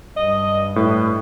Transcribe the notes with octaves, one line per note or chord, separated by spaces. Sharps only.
G2 D#5
A2 B4